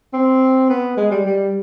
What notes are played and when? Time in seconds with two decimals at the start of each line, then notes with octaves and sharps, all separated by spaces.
0.13 C4
0.70 B3
0.97 G#3
1.11 G3
1.26 G3